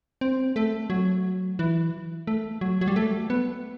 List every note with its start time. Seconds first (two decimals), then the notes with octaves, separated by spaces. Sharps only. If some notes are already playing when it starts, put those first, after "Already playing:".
0.21 C4
0.56 A3
0.90 F#3
1.59 E3
2.27 A3
2.61 F#3
2.81 F#3
2.88 G3
2.96 A3
3.30 B3